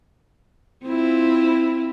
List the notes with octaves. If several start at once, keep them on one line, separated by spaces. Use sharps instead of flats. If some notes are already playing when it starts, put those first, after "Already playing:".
C4 E4 F4